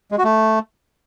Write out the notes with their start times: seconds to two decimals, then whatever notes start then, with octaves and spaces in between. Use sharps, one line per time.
0.12 G#3
0.18 F#4
0.24 A3